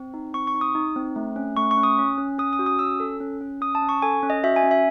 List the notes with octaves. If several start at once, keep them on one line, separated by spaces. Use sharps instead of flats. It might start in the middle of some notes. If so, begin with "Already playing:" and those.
Already playing: C4
D#4
C4 C#6
C#6
D#4
D#6
D#4
C4
A3
C#4
A3 C#6
C#6
C#4
D#6
C#4
C#4
C#4 D#6
D#6
F#4
D#6
C#4 E6
A4
C#4
C#4
C#4 D#6
A5
C#4
C#6
A4 G#5
C#4
D#5
F#4 E5
G#5
C#4
E5